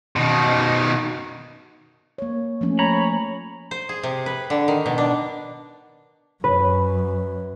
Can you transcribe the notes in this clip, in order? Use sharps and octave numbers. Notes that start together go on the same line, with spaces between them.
B2 D#3
A#3 C#5
F3 A3 C#4
C#5 A#5 B5
C5
G#4
C3
B4
D3
D#3
B2
D4
F#2 B4